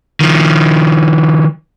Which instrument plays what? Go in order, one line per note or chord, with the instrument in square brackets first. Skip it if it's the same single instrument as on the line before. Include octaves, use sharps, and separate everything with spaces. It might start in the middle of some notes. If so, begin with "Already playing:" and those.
[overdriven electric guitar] D#3 F3